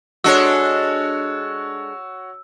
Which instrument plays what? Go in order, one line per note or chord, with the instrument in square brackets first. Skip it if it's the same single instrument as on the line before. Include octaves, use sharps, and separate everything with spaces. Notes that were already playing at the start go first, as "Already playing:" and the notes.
[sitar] G#3 D4 A4 [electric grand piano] F#4 C#5 [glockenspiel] E6